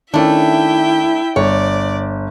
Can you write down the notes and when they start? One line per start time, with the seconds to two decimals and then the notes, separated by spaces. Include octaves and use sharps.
0.14 D#3 A3 C#4 D4 E4 E5 G5
1.36 G1 C#5 D5